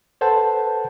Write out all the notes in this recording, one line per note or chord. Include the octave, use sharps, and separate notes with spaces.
A4 B4 C5 F#5 A5